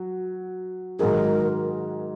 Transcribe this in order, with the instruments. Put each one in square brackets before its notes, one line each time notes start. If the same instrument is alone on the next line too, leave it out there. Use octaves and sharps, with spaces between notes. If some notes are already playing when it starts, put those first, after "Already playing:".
Already playing: [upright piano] F#3 F#4
[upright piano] G#2 D#3 F#3 D#4 G#4 [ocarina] A#4